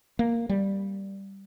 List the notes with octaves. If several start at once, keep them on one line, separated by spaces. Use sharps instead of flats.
A#3
G3